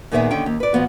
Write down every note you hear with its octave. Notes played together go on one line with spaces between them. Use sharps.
A#2 D#3 B3 G#4 D#5 E5
D#2 D3 D#3 C#4 G5
D#2
B4 D5
B2 F3 B3 F#4